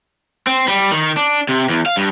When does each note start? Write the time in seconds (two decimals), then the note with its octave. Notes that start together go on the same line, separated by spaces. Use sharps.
0.47 C4
0.68 G3
0.92 D#3
1.17 D4
1.49 C3
1.69 E2
1.86 F5
1.97 G2